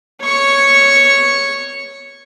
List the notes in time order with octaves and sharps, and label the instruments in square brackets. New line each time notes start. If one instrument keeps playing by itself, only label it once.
[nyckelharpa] C#5 C#6